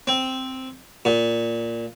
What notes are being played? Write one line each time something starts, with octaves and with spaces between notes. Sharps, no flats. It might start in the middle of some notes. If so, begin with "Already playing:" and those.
C4
A#2